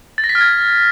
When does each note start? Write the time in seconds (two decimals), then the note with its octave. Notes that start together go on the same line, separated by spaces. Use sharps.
0.18 A6
0.24 A#6
0.29 B6
0.35 F6
0.41 G#6